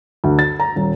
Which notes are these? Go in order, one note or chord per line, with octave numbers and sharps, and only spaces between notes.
D2
A6
A#5
D#1